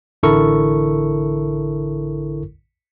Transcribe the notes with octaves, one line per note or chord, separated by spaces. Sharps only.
A1 D3 E4 A4 A#4 C#6